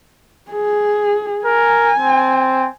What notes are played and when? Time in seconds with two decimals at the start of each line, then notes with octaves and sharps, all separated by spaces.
0.51 G#4
1.45 A#4 G#5
1.98 C4